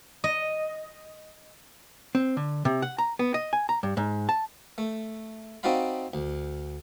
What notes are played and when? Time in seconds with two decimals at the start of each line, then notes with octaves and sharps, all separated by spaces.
0.24 D#5
2.15 C4
2.37 D3
2.65 C3
2.82 F#5
2.98 A#5
3.19 B3
3.34 D#5
3.53 G#5
3.69 A#5
3.83 G2
3.97 G#2
4.29 A5
4.78 A3
5.63 C4 D#4 F#4 D5 F5 B5
6.14 D2